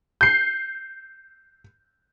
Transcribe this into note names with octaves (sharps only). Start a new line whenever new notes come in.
G6 C7